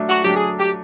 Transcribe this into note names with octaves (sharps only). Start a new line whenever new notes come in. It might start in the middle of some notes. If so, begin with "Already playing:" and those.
Already playing: F#3 A3 D4
F#4
F#3 A3 D4 G4
G#4
G4